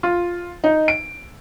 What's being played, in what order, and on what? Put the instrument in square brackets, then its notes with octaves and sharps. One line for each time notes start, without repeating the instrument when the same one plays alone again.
[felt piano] F4
D#4
D7